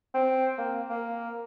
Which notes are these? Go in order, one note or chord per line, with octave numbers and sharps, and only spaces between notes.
C4
A#3
A#3